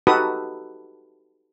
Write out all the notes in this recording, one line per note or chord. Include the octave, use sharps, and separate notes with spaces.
D#4 F#4 G4 A4 B4 D#6